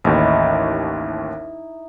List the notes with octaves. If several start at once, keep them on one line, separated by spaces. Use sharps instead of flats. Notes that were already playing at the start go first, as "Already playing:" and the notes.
A1 D#2 D#4 E4